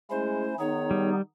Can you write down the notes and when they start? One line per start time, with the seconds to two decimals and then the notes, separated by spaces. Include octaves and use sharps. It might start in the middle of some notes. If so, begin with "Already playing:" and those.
0.11 G#3 A3 C#4 E4 C5
0.59 D#3 B3 D#4 G#4 C#5
0.91 G3